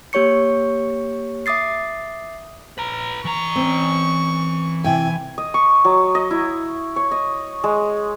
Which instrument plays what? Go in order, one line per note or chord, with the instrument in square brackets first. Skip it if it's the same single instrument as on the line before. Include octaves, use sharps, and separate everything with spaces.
[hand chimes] A#3 G4 C#5 C#6 C#7
E5 D6 D#6 A6 C7
[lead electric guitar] B4 A#5
[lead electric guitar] E3 A#5 [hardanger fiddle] C#6
[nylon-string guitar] C4 C#4
[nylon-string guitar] C3 E4 G5 [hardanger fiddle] G#5
[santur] D#5
C#6
F#3
D#5
E4
C#5
D#5
G#3